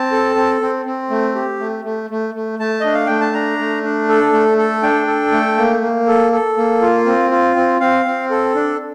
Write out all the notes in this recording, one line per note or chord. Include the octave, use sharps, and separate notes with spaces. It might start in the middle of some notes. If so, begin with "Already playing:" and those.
Already playing: C4 A5
A4
C4
C4
C4
A3
G4
A3
A3
A3
A3
A3 A5
D4 D#5
F5
A3 G5
A5
D4 A#5
A3
D4
A4
A3
A4
D4 G5
A4
A3
A#3
A#3
A4
A4
A#3
F4
C4
F4
C4
C4 F5
C4
A4
D4